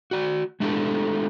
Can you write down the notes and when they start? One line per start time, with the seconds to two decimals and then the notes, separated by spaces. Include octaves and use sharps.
0.11 F#4 D5
0.60 G#3 A3 D4 E4 G4 A4